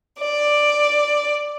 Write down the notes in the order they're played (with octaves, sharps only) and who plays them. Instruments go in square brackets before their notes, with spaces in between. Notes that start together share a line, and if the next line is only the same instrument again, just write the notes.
[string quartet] D5